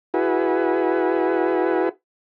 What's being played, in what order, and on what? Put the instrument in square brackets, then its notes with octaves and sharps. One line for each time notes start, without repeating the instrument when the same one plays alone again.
[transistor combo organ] E4 F#4 G#4 B4